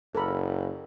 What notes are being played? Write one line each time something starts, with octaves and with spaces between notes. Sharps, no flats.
F#1 A4 A#4 B5